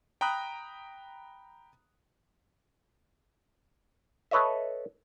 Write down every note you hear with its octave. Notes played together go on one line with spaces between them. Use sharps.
G5 A#5 B5 D#6 F#6
A4 B4 C#5 D#5 E5